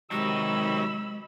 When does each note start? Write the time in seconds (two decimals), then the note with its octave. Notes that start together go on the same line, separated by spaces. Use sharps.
0.11 C3 D#3 F#3 G#3 D#4 G4 B5 E6